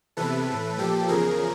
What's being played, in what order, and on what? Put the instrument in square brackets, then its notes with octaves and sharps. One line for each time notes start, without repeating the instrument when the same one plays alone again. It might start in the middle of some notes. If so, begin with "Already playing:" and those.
[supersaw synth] E2 C3 E3 A4 B4
A2 E3
A#2 F3 G4 A4
E2 C#3 F3 G#4 A#4